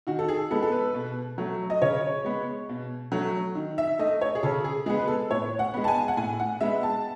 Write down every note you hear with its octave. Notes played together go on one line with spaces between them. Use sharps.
D#3 F#4
A4
G#4
G#3 B3 A4
A4
B4
B2
F#3 A3
D#5
C#3 C#5
G#3 B3
B2
F#3 A3
D#3
E5
A3 D#5
C#5
G#4
C#3 A4
G#4
G#3 B3 G#4
B4
A4
A2 C#5
F#5
G#3 B3
A5
G#5
F#5
A2 G#5
F#5
G#3 B3 E5
A5